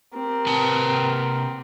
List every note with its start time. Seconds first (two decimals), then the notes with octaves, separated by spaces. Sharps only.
0.14 C4 G4 A#4
0.47 C3 B4 A5